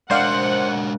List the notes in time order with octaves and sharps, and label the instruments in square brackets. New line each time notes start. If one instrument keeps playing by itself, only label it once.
[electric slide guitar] G#3 D4 A#4 [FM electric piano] C5 [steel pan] D5 F5 [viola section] F#5